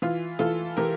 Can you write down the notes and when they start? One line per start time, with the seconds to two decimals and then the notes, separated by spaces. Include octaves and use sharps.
0.02 E3 F4
0.39 E3 F4 A4
0.77 E3 G4 A#4